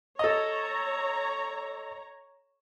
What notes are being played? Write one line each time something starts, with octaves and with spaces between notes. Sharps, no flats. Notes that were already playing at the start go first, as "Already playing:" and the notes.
A4 C#5 D#5 A#5